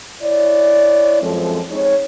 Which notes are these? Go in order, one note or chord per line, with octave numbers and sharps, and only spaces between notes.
E4 C#5 D5
F#2 F3 G#3 C4 A4
G#3 C4 D#4 C#5